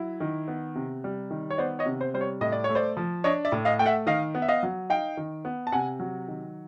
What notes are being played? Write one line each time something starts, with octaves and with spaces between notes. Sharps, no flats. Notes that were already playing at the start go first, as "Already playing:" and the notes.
Already playing: F#3 E4
D#3
B3
C3
G3
D#3
C#5
B3 C5 D5
C#5 D#5
C3
C5
G3 C5
C#5
A2 D#5
D5
C#5
A3
C5 D5
F3
D4 C#5 D#5
D5 E5
A2
D#5 F5
A3 G5
E5 F#5
D#3 D#5 F5
B3
E5
D#5 F5
F#3
D#4 F5 G5
D#3
B3
A5
C3 F#5 G#5
F#3
D#3